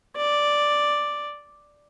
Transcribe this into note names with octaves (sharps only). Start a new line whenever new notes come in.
D5